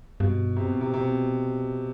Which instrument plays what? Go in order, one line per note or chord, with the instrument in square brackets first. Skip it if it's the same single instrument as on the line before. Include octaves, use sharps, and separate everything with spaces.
[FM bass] G2 [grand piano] B2
[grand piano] C3
B2
C3
C3
B2